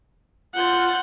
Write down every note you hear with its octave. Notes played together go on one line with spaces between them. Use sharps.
F4 F#5 G6 A6